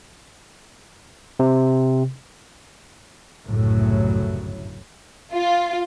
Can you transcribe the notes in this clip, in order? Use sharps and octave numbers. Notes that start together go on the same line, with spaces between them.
C3
G1 C2 F#2 A2 C#3 F#3
F4